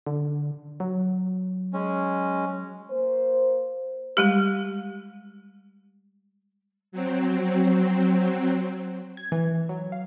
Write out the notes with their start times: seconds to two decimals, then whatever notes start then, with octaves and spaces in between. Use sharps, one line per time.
0.06 D3
0.80 F#3
1.73 G#3 C#4
2.90 A#3 C5
4.17 G3 G#3 G4
6.92 F#3 C4
9.17 G#6
9.32 E3
9.69 F#3
9.92 F5